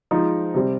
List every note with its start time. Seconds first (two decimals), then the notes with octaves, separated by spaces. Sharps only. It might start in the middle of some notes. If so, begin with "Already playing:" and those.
0.11 F3 G#3 D#4
0.54 C3 G3 C4